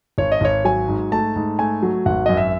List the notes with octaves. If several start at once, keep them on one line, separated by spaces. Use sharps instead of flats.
G#1 C#5
D#5
G#1 C#5
F#3 G#5
G#2
A3 A5
G#2
A3 G#5
F#3
G#1 F#5
F#2 D#5
E5